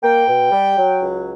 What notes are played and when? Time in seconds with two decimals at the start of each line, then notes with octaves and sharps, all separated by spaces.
0.03 A#3 G5
0.27 B2
0.52 G3
0.76 F#3
1.00 C#2